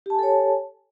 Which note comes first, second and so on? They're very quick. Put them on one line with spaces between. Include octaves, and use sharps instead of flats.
G4 A5 G#5 A4 C#5